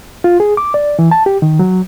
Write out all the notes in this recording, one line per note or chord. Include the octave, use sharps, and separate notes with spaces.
F4
G#4
D6
D5
E3
A5
G4
D#3
F#3